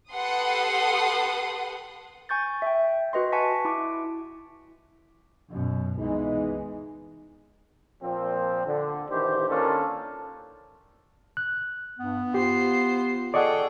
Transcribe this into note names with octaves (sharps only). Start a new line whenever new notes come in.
G4 A4 B4 F#5 C6 D#6
G#5 C#6 G6 A6
E5 G5
F#4 B4 D#5 C6
F#5 G#5 A5 C#6 B6
E4 D6
F#2 B2
C2 E3 G#3 B3 D#4
A#2 F3 C4
D3
A#1 D#3 E3 G4 C5
D#3 A#3 C#4 D4 F4 A4
F#6
G2 B3
F4 G4 C5 C7
G#4 A4 D5 D#5 F#5 G5 C#6